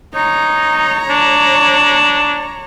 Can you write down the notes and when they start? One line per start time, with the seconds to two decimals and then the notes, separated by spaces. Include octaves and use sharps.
0.15 D#4 C#5 A#5
1.10 D4